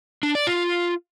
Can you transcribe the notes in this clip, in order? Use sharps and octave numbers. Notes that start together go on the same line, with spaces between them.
D4
D5
F4